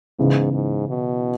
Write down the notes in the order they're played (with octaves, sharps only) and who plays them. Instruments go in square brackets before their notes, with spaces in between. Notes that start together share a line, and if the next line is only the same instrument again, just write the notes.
[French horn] G#2 [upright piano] C#3 E3 B3 E4
[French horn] G#2
B2